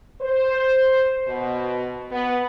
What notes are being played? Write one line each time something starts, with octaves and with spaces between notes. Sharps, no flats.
C5
B2
B3